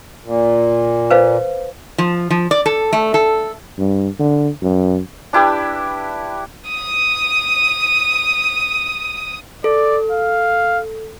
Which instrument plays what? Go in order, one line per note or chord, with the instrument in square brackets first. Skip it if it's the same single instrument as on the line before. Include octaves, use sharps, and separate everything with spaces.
[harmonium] A#2
[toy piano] B4 C5 F5
[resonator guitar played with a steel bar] F3
F3
D5
A4
A3
A4
[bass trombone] G2
D3
F#2
[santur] D4 E4 G4 B4
[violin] D#6 D#7
[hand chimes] A4 [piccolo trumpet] D5
[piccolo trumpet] F5